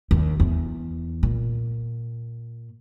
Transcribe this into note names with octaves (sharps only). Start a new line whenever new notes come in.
D#2
E2
A#2